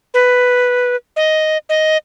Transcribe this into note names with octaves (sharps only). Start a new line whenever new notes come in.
B4
D#5
D#5